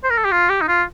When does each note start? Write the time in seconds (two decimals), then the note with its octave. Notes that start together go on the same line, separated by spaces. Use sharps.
0.04 C5
0.10 A#4
0.17 A4
0.25 G4
0.32 F4
0.49 G4
0.61 D#4
0.68 F4